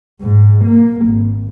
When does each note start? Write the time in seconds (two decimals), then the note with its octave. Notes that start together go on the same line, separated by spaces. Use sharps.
0.21 G#2
0.65 A#3
1.06 G#1